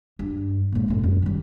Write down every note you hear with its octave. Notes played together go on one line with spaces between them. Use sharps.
G2
A#2 G#3
F#2 A2
F#2
D#3 G3